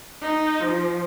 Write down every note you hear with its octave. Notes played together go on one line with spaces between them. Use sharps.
D#4
F3